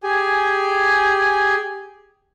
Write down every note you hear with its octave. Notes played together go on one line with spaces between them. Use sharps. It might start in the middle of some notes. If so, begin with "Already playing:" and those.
G4 G#4 G#5